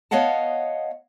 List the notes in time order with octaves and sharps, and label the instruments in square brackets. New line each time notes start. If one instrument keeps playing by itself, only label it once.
[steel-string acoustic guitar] B3 C#5 D#5 F5 F#5 A5